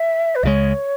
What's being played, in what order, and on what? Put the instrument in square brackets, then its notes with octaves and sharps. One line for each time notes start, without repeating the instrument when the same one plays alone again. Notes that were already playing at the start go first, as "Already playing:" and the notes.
Already playing: [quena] E5
B4
[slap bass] C#2 C#3 G#3 [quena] C#5 E5